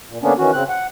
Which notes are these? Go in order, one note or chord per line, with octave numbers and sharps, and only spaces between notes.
A#2
D3 A#3 B3 C#4 D4
D#3 E3 C#4 F#4
C#3 C4 F#6
F#5